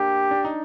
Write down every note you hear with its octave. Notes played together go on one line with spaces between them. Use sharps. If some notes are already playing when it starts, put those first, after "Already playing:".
Already playing: A#3 D4 G4
D4
D#4